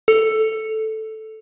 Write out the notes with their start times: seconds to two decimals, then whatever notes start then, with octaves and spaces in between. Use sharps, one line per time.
0.08 A4